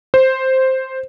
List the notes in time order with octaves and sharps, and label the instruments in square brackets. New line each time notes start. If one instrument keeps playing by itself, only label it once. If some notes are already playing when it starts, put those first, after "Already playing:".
[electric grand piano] C5